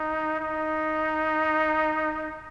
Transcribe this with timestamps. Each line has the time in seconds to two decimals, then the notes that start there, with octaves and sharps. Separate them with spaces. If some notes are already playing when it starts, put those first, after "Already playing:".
Already playing: D#4
0.40 D#4